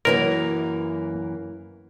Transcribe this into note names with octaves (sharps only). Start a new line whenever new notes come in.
F#2 E3 A#3 A#4